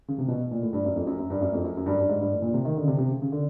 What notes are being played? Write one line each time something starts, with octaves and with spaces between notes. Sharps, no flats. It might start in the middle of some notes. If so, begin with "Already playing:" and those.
C#3
C3
B2
A#2
A2
G2
F#2
F2
F#2
F#2
G2
F#2
F2
F#2
F#2
G2
G2
G#2
G2
A2
A#2
C3
D#3
D3
C#3
C3
C3
C#3
C#3
D3